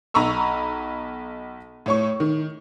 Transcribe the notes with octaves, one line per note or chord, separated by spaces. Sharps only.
B1 A#5 B5 C#6 E6
A2 C#5 C#6
D#3